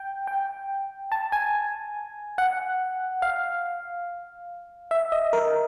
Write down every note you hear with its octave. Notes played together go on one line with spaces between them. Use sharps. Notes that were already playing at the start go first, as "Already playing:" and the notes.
Already playing: G5
G5
A5
G#5
F#5
F5
E5
D#5
A#4